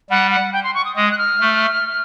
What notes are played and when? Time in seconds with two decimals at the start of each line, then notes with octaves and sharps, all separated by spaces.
0.10 G3 F#5
0.31 F#5
0.53 G5
0.64 C6
0.74 C#6
0.85 D#6
0.96 G#3 D#6
1.11 F#6
1.18 F6
1.40 A3